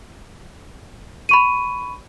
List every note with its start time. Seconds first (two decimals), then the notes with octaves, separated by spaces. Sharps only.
1.29 B5 C#6 D#7